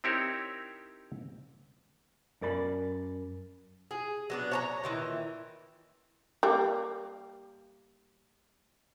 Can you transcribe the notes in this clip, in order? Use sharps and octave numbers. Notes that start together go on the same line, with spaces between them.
C4 D#4 E4 G4 A#4 C#5
F#2 A#4 D5 B5
G#4
F#3 B3 D4
C#5 A5 A#5
A#2 D#3 E3
G3 A#3